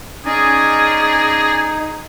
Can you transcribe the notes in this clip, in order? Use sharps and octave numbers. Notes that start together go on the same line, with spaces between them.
C#4 D#4 G#4 D5 D#5 G#5